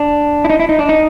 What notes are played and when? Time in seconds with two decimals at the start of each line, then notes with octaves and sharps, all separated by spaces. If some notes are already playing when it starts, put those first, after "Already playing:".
Already playing: D4
0.45 E4
0.50 D#4
0.60 E4
0.69 D#4
0.79 D4
0.89 D#4